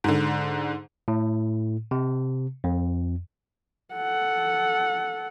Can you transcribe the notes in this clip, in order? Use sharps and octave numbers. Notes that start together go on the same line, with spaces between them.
G#2 D3
A2
C3
F2
A4 F#5